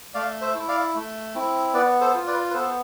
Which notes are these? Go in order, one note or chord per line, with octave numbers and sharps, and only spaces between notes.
A3 D5 F5
C5 E5
E4
D5 F5
A3
C4 E4
B3 B4 D5
A4 C5
F4
B4 D5
B4
B3 A4 C5